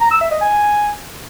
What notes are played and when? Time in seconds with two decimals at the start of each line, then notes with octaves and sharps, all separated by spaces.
0.01 A#5
0.11 E6
0.21 E5
0.31 D#5
0.41 G#5